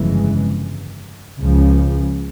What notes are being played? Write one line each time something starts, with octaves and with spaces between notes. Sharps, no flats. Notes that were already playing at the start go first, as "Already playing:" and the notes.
Already playing: G1 F2 C#3 E3 G#3
C#2 C#3 F3